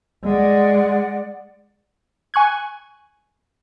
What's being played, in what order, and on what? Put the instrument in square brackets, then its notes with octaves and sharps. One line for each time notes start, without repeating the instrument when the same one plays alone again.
[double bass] G#3 [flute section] D5 F#5
[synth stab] G#5 C#6 F#6 G#6